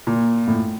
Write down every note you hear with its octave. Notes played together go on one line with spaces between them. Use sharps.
A#2
A2